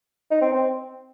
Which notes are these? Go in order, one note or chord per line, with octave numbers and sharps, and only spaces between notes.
D#4
C4
C4